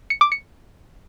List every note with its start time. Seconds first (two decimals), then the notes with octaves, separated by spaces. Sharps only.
0.10 C#7
0.21 D6
0.32 C#7